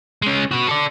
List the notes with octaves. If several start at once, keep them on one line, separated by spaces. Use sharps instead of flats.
G#3 C#4
B3 F#4
A4 D5